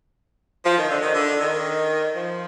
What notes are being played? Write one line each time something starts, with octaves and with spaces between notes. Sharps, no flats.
F3
D#3
D3
D#3
D3
D#3
F3